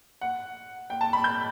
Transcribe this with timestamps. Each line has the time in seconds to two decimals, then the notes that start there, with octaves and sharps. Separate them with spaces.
0.21 F#5
0.90 G5
1.01 A5
1.13 B5
1.24 G6